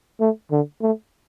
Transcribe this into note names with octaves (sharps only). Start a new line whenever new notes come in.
A3
D3
A3